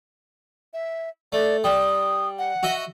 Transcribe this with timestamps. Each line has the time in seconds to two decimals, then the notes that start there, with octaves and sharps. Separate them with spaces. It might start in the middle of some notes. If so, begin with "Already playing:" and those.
0.73 E5
1.32 A3 D5
1.64 G3 D#6
2.38 F#5
2.63 F#4 D#5 E5